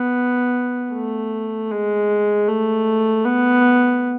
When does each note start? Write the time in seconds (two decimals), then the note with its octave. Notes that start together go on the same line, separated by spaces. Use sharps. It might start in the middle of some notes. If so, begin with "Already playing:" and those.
Already playing: B3
0.93 A3
1.71 G#3
2.48 A3
3.25 B3